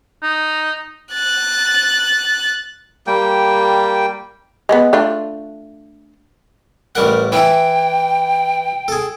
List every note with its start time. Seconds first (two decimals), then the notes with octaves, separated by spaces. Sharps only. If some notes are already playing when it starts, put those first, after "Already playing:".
0.23 D#4
1.13 F#6 A6
3.07 G3 A#3 G5
4.69 G#3 A3 B3
4.93 A3 D4 F4
6.95 A1 G3 A#4 F#5
7.32 E3 E4 G5
8.88 G#4 A4